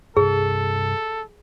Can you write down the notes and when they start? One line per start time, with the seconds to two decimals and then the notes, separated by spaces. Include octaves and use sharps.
0.17 G2 C3 G#4 A4